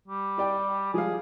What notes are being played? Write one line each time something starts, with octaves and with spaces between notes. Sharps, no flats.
G3
G4 D5 G5
F3 G3 G#4 F5